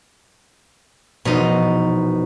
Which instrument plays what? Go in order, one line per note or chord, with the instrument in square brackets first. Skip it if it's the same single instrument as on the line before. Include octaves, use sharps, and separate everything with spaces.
[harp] E1 A#1 F3 [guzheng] B2 D#4